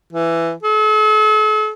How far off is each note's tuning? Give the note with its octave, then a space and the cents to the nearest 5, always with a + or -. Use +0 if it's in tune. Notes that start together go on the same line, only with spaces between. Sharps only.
E3 +15
A4 -45